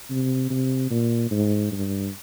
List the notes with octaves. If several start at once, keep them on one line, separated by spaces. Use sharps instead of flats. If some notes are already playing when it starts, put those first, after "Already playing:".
C3
C3
A#2
G#2
G2